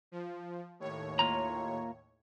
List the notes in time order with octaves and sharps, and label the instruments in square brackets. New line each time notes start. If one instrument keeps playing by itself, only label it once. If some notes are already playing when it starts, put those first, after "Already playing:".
[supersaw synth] F3
D#2 A2 C#5
[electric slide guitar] A#3 F4 A#5